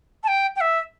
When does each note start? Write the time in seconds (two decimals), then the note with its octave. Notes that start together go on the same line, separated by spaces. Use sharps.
0.23 A5
0.28 G5
0.56 G5
0.61 E5